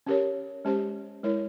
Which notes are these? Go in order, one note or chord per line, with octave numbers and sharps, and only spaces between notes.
C#4 G4 A#4 C#5
G#3 C#4 G4 C5
G#3 E4 A#4 C#5